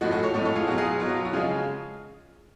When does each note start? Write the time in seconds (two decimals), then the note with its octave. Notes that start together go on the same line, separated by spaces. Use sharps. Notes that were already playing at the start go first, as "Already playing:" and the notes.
0.01 A2 F3 G#3 F#4
0.11 F#4 A4
0.23 A4 C#5
0.34 A2 F3 G#3 A4 C#5
0.45 A4 C#5
0.55 F4 G#4
0.67 B2 F#3 F#4
0.77 F4 G#4
1.00 B2 F#3 F4
1.09 F#4
1.17 F4
1.25 F#4
1.33 C#3 F3 G#3 F4 G#4